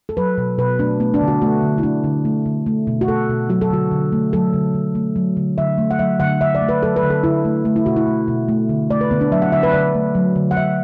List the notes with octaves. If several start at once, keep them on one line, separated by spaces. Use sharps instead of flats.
A4
F#3 B4
B2
B2 B4
A3 D4
A3 B3
D4
D3
F#4
A3 F#4
D3
E4
A3 D4
D3
A3
D3
A3
B2
F#4
A3 A4
B2
F#3 F#4
A4
D3 F#4
D3
A3
F#3 A4
D3
D3
A3
F#3
D3
D3 E5
A3
F#5
F#3 E5
D3 F#5
D3 E5
D5
A3
B4
F#3 A4
B4
D3
A4
D3 E4
A3
A3
E4
B2 F#4
E4
A3
B2
A3
D3
A3 D5
B4
D3 B3
D4
F#3 E5
F#5
D3 E5
B4
D3 D5
A3
F#3
D3
F#5
D3 E5